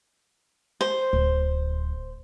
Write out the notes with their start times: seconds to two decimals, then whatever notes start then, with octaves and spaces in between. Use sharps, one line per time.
0.81 C5
1.13 D1